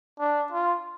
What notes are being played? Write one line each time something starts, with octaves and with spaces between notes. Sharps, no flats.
D4
F4